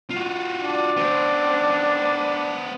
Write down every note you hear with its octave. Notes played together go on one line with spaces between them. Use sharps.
F4 F#4
D4
B3 C5